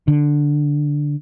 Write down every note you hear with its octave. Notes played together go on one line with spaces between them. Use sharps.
D3